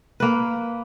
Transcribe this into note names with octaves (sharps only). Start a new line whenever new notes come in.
A#3 B4